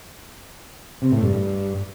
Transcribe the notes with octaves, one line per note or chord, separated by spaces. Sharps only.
C3
A2
G2
G2